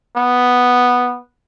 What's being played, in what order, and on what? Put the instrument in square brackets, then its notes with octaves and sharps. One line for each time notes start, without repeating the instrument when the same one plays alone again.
[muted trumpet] B3